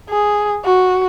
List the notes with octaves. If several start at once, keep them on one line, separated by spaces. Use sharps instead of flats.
G#4
F#4